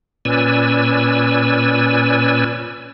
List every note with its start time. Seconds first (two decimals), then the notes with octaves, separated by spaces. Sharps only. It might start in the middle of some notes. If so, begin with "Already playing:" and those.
0.25 A#2 C#4 B4 D5 G#5 E6